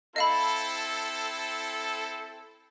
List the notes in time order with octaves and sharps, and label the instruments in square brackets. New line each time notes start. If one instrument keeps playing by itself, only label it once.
[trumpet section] C4 E4 A4 [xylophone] D#5 F5 B5